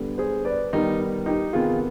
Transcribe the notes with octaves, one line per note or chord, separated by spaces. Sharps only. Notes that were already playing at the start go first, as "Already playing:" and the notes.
Already playing: D3 G3 B3
G#4 C5
B4 D5
D#3 G3 B3 D#4
D#4 G4
C3 D#3 B3 F4 G#4